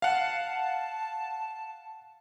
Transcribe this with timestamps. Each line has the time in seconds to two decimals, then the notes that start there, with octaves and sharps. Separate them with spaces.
0.02 F5 F#5 A5